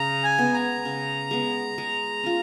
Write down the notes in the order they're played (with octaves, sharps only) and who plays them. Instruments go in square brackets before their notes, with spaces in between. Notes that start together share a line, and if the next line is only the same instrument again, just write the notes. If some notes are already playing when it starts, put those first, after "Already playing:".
Already playing: [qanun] C#3 [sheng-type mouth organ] A#5
[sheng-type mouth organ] G#5
[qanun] G#3 B3
[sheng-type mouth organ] A#5
[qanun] C#3
G#3 B3
G#3
C#4 F4